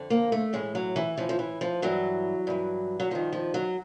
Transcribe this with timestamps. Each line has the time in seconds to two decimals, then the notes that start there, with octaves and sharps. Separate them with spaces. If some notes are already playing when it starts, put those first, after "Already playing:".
Already playing: F2 D3
0.10 A#3
0.32 A3
0.53 A2 E3 G#3
0.75 F#3
0.96 E3
1.17 A2 E3 F3
1.29 F3
1.39 E3
1.61 F3
1.82 G2 E3 F#3
2.47 G2 E3
3.00 F#3
3.11 G2 D#3 F3
3.33 F3
3.54 F#3